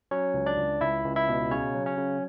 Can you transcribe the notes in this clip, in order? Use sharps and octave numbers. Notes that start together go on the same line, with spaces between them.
F#3 C#4 C#5
C#2
D4 D5
C#2
C#2 E4 E5
C#2
E4 E5
B2
C#3 C#4 C#5
F#3
C#4 C#5
C#3